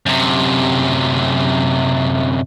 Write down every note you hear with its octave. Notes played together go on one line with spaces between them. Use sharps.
F#2 C3